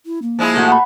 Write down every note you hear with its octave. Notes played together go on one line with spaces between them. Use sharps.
E4
A#3
F3 G#3 E4
A#2 A3 F#4
F#5 B5